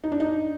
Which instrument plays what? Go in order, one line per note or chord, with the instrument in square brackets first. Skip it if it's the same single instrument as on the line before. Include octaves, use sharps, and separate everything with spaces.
[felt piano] D#4
D4
D#4